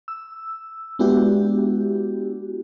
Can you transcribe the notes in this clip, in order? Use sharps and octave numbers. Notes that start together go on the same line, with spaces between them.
E6
G#3 B3 D4 E4 F#4 G4